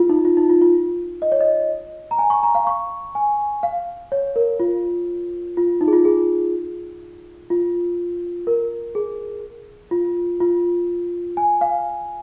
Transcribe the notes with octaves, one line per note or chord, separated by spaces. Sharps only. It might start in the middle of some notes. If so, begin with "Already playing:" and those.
Already playing: F4
D#4
F4
D#4
F4
F4
D#5
C#5
D#5
A#5
G#5
C#6
A#5
F5
C#6
G#5
F5
C#5
A#4
F4
F4
D#4
G#4
F4
G#4
F4
A#4
G#4
F4
F4
G#5
F5